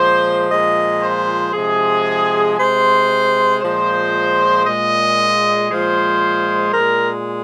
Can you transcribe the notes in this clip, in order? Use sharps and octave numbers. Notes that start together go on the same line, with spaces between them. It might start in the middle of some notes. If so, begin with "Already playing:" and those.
Already playing: A#2 F3 G#3 C5
A#2 F3 G#3 D#5
C5
C3 F3 G#3 G#4
C3 G#3 C5
A#2 F3 G#3 C5
A#2 G#3 D#5
A#2 F3 G#3 C5
A#2 G#3 A#4